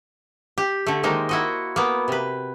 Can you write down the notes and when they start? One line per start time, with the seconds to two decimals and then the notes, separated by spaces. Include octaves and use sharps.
0.58 G4
0.87 D3 A3
1.03 D#3 G#3 A#3 D#4 C5
1.29 E4 F#4 D#5
1.76 A#3 B3
2.08 C3 B4